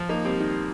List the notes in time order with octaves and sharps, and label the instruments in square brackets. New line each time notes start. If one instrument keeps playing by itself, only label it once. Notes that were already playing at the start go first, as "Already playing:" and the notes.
Already playing: [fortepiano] F3
A#3 D#4
G3 C4
D#3